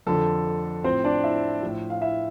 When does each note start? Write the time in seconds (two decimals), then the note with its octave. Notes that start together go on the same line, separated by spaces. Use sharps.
0.07 F2 D3 F3 A4
0.84 A2 F3 C4 C5
1.04 D4 D5
1.24 E4 E5
1.63 A2 F3
1.90 F5
2.01 E4 E5